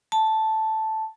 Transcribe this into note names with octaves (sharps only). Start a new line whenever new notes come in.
A5